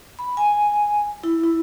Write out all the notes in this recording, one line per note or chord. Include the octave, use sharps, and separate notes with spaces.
B5
G#5
E4
E4